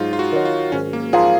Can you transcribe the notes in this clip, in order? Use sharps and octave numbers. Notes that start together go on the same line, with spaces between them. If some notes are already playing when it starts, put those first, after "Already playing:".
Already playing: G#2 F#3 D#4 F4
F4
F#4
D#3 F#3
F4
G#1 C#4
A#3
G#2 F3 A#3 F4 G#4